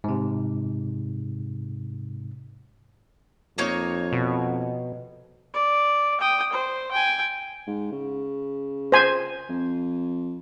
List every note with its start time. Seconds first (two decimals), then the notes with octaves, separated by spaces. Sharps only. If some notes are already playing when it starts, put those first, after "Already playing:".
0.04 G#2 C3
3.58 F2 A#3 D#4 C#5
4.13 B2
5.54 D5
6.21 G5 D#6
6.53 C5
6.92 G5 G#5
7.67 G#2
7.92 C#3
8.92 C5 G#5
9.50 F2